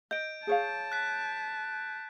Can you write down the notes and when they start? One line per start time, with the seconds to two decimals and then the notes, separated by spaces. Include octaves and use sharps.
0.11 D#5 G6 D7
0.47 G#4 C#5 F5 A5
0.92 F#6 B6